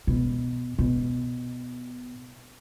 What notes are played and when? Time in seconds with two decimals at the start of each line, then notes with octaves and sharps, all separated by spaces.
0.07 B2
0.78 B2